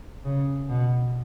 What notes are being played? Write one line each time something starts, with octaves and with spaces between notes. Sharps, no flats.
C#3
B2